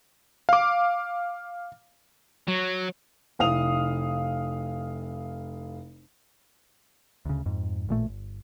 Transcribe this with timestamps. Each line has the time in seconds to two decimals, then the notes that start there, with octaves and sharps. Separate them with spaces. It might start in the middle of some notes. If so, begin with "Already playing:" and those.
0.49 F5 D6
2.48 F#3
3.39 F1 E4 F5 D#6 F7
7.25 D2 C#3
7.46 F2 G#2
7.89 A1 A#2 A3
8.08 G1